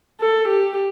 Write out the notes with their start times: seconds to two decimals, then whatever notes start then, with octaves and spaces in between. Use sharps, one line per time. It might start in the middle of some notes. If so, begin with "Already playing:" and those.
0.21 A4
0.48 G4